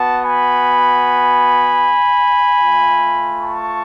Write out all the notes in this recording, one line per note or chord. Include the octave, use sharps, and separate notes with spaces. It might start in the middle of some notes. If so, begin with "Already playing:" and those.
Already playing: B3 F#4 F#5 A5
G#5 B5
A3 F4
A5 C#6